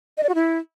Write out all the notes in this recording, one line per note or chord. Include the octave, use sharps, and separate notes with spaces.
D#5
D5
F#4
E4